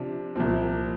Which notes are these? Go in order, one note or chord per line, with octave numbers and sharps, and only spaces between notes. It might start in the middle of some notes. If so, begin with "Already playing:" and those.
Already playing: C3 F3 D4
C2 A#2 F3 C4